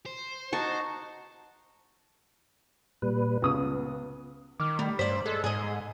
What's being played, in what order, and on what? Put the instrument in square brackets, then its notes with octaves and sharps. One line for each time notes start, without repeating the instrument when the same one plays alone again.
[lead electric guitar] C5
[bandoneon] D#4 F#4 [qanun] A5 C#6
[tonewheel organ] A#2 G3 B4
[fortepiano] C#2 D#6 [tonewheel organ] B3
[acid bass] D#3 [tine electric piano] D6 F6
[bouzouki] G3 [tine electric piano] A3
[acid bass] G2 [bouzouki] C5 D5 [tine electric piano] B6
[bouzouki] G#3 [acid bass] A4
[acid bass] G#2 [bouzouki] G#4 D#5